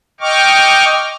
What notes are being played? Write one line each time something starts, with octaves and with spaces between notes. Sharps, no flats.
D#5 G5 C#6 D6 F6